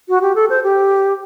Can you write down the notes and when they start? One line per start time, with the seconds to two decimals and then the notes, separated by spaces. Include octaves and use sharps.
0.09 F#4
0.22 G4
0.35 A4
0.50 C5
0.63 G4